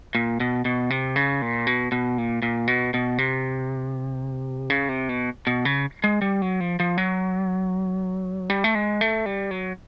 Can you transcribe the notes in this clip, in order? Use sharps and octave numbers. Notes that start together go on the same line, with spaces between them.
A#2
B2
B2
C3
C#3
A#2
B2
B2
A#2
A#2
B2
B2
C3
C#3
C3
B2
B2
C#3
G#3
G3
F#3
F3
F3
F#3
G3
A3
G#3
A3
G3
F#3